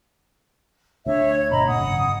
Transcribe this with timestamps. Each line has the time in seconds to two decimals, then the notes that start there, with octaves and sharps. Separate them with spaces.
1.06 D2 D4 C#5 E5
1.36 G#6
1.50 G1 B2 D#5 A#5 B5
1.67 A#2 C#3 F#5 D#6
1.80 G#1 F#2 C#3